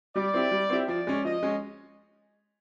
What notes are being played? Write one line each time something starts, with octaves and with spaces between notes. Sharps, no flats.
G3 D5
C4 E4 G4
G3
C4 E4 G4
F3 D5
G#3 C#4
F3 D#5
G#3 C#4